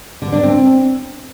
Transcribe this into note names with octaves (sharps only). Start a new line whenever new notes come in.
D3
D4
C4